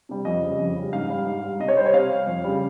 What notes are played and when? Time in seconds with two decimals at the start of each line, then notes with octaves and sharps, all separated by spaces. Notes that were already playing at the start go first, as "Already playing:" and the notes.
0.09 C3 G3
0.25 F2 D#5
0.43 C#3 G3
0.59 F2
0.76 C#3 G3
0.93 G#2 F5
1.10 G3
1.26 G#2
1.43 G3
1.60 C3 D#5
1.68 C#5
1.77 G3 C5
1.86 C#5
1.93 C3 F5
2.10 G3
2.27 F2
2.44 C#3 G3